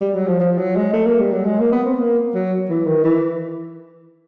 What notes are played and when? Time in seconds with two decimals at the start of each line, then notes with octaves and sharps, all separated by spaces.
0.01 G3
0.15 F#3
0.28 F3
0.40 F3
0.58 F#3
0.76 G#3
0.93 A3
1.06 A#3
1.20 G3
1.32 F#3
1.45 G#3
1.60 A#3
1.72 B3
1.86 C4
1.94 B3
1.99 A#3
2.34 F#3
2.69 E3
2.86 D#3
3.04 E3